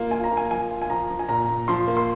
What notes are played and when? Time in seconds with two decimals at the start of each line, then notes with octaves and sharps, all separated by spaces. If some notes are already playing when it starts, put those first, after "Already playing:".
Already playing: A#3 F4
0.11 F4 G#5
0.24 A#5
0.31 A#3
0.37 G#5
0.51 F3 G#5
0.71 F4
0.82 G#5
0.90 F3 A#5
1.10 F3
1.19 G#5
1.29 A#2 A#5
1.49 A#2
1.68 F3 C6
1.88 A#3
1.97 C6